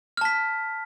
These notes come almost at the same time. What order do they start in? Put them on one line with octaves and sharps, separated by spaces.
F6 A5 B6